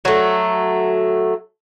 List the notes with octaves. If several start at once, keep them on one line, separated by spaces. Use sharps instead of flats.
F#3 A3